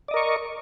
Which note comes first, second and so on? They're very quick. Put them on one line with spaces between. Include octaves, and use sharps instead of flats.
D5 D#5 A#4 C#6